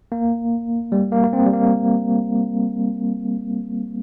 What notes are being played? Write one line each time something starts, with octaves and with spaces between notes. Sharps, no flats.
A#3
G3
A#3
A#3
C4
G3
A#3